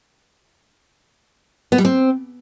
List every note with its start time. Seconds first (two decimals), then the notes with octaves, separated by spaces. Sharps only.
1.72 B3
1.78 G3
1.85 C4